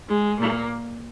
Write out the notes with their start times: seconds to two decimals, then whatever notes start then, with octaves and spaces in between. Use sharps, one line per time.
0.09 G#3
0.39 A#2 A#3